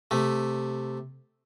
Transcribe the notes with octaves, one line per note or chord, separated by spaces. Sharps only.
C3 A3